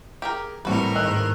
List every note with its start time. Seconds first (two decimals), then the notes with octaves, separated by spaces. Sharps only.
0.22 G4 G#4 A#4
0.65 A2 E3 G3 C4 D4 F#4 A#4 B4
0.95 G#2 D#3 D#5 E6 F#6